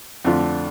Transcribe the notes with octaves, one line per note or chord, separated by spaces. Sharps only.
F2 D3 A3 D4 F4